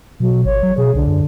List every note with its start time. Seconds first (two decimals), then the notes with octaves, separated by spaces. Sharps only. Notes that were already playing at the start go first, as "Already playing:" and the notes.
0.20 B2 F#3
0.45 G#1 C#5
0.63 F#3
0.77 B2 G#4
0.95 C2 D3
1.07 F#2